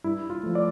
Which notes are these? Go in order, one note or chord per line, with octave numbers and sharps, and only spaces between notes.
G2 E4
F4
F3 A3
D5